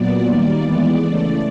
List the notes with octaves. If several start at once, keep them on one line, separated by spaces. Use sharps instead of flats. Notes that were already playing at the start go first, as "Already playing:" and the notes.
Already playing: A#2 F#3 B3 D5
D#3 G3 A#3
E3 G#3 B3
C#3 E3 A3